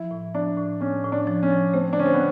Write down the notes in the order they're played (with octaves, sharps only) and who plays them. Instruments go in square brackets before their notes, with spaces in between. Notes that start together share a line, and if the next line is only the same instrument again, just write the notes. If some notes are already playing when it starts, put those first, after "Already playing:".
Already playing: [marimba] F3 [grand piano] E4
[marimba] A2
[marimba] F3 [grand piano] D4
[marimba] A2
[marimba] A2 [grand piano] C#4
[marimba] A2
[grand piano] D4
[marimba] F3
[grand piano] C#4
[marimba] F3
[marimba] A3 [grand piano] C4
[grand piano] D4
[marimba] D3 [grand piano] C#4
[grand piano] C4
B3